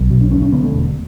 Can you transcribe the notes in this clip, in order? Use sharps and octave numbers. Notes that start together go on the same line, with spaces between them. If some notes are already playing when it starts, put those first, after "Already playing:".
Already playing: B1
B2
D4
D2 C#4
C#4
D3 B3
A3
E1